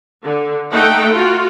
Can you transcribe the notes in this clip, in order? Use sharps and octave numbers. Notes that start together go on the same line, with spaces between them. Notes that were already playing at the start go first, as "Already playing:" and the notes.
D3
A3 D#4 A4 F#5 G5
F4 F#4